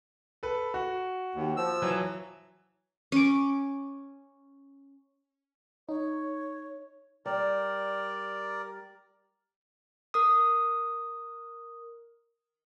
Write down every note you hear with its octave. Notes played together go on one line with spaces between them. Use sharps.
A4 B4
F#4
D#2
F3 E6
E3 F#3
C#4 D6
D#4 C#5
G3 A#4 D5
A#4 D#6